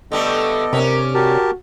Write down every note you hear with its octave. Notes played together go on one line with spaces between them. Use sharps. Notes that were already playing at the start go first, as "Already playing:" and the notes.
D3 G3 A3 B3 A4 D#5
C3 C#4 D4 A#4
F#4 G4 A#4 A5